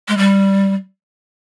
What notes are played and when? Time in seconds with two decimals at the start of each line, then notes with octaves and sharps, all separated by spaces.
0.08 G#3
0.18 G3